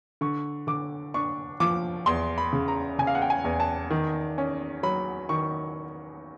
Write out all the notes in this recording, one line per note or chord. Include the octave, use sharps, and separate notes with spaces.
D3 C#6
D3 D6
D4 C#6
F3 D6
E2 C6
B5
C#3
A#5
C#3 G#5
F5
F#5
G5
G#5
E2
A5
D#3
C#4
F#3 B5
D#3 C#6